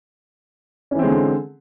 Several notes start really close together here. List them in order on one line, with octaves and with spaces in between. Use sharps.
C#4 E3 C4 G#3 D3